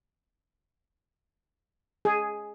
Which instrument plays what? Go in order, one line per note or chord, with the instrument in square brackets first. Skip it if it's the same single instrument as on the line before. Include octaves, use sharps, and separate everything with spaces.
[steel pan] G#4